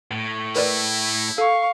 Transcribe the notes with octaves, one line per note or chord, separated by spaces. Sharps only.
A2
E4 A#4 B4 D5
A4 F5 C#6